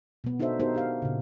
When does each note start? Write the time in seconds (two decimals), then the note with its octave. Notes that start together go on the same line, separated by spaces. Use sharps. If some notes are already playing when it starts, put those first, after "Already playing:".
0.24 B2 B3
0.39 D4 D#4 F#4 A4 C5 E5
0.60 B3 D#4 F#4 G4 A#4 C5
0.74 D4 G4 F5
1.02 A#2 C#3